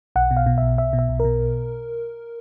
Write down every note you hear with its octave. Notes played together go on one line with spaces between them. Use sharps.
B1 F#5
B2
F5
B2
B1 E5
B1 E5
B2
E5
B1
B2 A#4